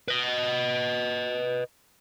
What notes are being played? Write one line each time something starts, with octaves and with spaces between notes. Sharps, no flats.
B4 D#5